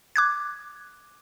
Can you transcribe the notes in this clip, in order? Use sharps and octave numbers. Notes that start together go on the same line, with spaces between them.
D6 F#6 G#6